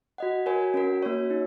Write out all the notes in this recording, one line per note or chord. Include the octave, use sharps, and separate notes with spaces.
F#4 D#5 F#5
F#4 A#4 C#5 G#5
C#4 F#4 A#4
A#3 F#4 C#5
D#4